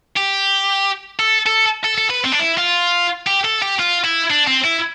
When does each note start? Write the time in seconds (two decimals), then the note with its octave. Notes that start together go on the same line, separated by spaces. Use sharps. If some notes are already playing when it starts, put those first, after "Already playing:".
0.16 G4
1.19 A4
1.46 A4
1.84 A4
1.98 A4
2.10 B4
2.25 C4
2.33 D4
2.40 E4
2.58 F4
3.27 G4
3.45 A4
3.62 G4
3.79 F4
4.04 E4
4.31 D4
4.48 C4
4.65 E4